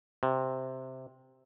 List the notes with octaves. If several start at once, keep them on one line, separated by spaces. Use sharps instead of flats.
C3